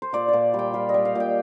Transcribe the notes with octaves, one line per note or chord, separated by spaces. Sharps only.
C5
A#2 D5
A#2 D5
G3
G5
G3 F5
D#5
G3
F5
A#2 G5